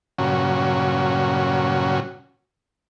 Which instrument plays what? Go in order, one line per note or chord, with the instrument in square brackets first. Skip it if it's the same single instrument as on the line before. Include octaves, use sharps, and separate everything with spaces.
[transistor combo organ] G2 A#2 C#3 F#3 C#4 F#4